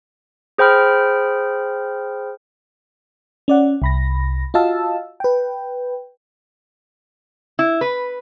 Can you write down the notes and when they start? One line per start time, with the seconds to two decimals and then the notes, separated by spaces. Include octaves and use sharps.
0.58 G#4 C5 G5 B5 F6
3.48 C#4 D5 F#5
3.82 C2 B5 A#6
4.54 F4 F#4 D#5 F5 A5 E6
5.20 B4 G5
7.59 E4
7.81 B4